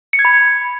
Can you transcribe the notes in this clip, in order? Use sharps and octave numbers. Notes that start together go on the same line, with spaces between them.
C#7
G#6
B5